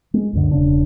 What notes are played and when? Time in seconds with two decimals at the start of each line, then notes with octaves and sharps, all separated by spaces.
0.14 G#3
0.33 C#2 F#2 D3
0.51 E1 C#3 D4